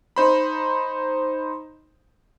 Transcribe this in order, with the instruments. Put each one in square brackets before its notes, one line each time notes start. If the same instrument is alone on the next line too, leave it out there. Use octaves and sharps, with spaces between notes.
[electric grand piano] D#4 C5 B5